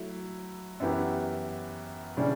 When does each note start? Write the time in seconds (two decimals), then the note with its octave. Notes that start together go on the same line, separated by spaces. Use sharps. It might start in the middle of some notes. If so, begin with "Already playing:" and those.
Already playing: F#3 A3 E4
0.80 F#2 E3 B3 E4 G4
2.17 C#3 E3 G3 D4